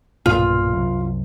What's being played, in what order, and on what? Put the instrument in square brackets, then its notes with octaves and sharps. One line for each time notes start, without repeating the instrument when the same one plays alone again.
[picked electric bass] B1 G2 A#2 [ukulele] F4
[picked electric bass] C2 F#2